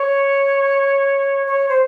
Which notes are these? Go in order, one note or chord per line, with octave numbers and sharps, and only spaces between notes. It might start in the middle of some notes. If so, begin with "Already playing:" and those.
Already playing: C#5
C#5
C5